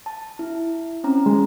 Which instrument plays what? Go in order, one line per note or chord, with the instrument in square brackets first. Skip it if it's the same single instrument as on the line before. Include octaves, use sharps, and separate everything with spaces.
[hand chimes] A5
E4
C4 C#4 A#5
[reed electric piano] G#3